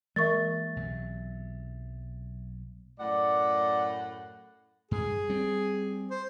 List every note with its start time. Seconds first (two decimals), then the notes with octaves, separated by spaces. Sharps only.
0.16 E3 G#3 A#3 A#4 E5 C#6 A6
0.76 B1 C3 F#3
3.00 F#2 A2 D5 F#5
4.91 G2 G#4
5.30 G3 C4
6.11 C5